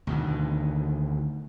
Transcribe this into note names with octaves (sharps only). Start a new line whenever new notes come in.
D2 B2 D#3